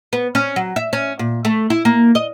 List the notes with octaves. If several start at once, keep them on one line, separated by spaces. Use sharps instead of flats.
B3
C#4
F#3
E5
C#4
A#2
A3
E4
A#3
D#5